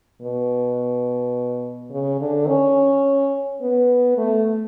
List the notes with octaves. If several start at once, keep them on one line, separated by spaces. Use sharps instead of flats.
B2
C#3
D3
C#4
B3
A3